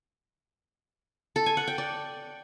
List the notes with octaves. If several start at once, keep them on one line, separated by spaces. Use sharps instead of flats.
A4
G#5
F#5
G5
D5